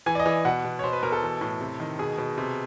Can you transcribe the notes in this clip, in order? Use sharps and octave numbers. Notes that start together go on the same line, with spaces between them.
E3 G#5
D5
D#5
E3
B2 F#5
B2
C#5
B2 C5
B4
B2 A#4
A4
E3
A2
C3
D#3
B2 G#4
B2
C3